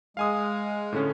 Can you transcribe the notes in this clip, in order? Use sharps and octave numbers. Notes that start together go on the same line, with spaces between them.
G#3 F5 G#5 D#6
A2 D3 C#4